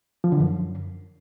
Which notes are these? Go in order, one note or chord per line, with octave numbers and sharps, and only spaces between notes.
F3
D3
F#2